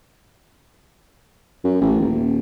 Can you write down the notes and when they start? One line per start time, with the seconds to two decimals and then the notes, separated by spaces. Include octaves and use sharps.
1.64 F#2
1.81 A1
2.00 D#1